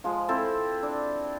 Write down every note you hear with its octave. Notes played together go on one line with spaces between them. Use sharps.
F3 G#3
C4 E4 A4
D4